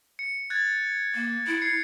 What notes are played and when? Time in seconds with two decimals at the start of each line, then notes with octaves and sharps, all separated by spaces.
0.19 C#7
0.50 F#6 G#6 A6
1.15 A#3
1.47 E4
1.61 G#6 C7 C#7